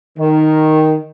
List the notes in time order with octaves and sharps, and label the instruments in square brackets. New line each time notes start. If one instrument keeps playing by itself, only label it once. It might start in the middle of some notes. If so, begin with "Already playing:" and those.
[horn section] D#3